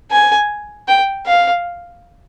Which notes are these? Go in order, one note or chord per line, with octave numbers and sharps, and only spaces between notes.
G#5
G5
F5